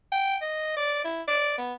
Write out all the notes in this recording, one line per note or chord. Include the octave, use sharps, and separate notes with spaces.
G5
D#5
D5
E4
D5
B3